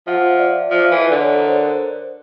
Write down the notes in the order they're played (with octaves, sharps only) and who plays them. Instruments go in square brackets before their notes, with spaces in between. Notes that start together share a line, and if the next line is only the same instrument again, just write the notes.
[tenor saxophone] F3 [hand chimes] E5 F#5
[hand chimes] D5 E5
[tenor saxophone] F3
[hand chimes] E5
[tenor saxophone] E3
[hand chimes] D#5
[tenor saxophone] D3 [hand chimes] D5
[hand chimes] C#5
A#4 C5
A#4 C5